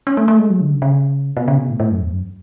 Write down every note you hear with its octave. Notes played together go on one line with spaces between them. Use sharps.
C#4
A3
A3
G#3
F#3
D3
C#3
C#3
B2
C#3
B2
A2
A2
F#2
E2
F#2